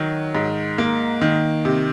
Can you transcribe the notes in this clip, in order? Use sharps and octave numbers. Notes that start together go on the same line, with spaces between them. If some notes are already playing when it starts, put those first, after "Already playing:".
Already playing: D#3 F#3
G#2
A#3
D#3
C3